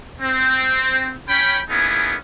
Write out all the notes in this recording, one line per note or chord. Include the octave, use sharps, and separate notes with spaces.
C4
C#4 G5 B5
A#3 B3 C#4 D#4 E4 G#4